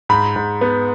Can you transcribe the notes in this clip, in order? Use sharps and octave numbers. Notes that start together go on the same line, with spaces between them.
G#2 B5
G#2
B3